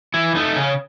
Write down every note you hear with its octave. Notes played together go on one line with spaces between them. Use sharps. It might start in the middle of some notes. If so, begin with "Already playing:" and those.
E3 E4
A3 D#4
C#3 C#4